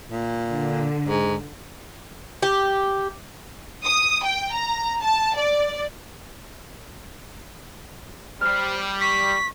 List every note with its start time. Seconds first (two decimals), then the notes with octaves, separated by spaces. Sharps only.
0.11 A#2
0.49 D3
1.08 G#2
2.43 G4
3.84 D#6
4.24 G5
4.53 A#5
5.01 A5
5.36 D5
8.41 G3 C5 F6 C7
9.01 C#6 B6